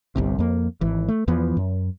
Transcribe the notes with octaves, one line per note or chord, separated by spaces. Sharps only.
G1 C2 C3
F2 A#3
G#1 E3
A3
E2 E3 F3 B3
F#2